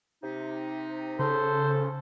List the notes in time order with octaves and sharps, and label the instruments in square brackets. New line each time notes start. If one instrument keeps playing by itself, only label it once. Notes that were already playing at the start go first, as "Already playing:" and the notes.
[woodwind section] C3 D#4
[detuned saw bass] C#3 [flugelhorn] A4 [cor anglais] C5